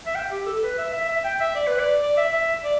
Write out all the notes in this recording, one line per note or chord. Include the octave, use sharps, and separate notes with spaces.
E5
G5
G4
A4
B4
E5
E5
E5
G5
E5
D5
B4
D5
D5
E5
E5
D5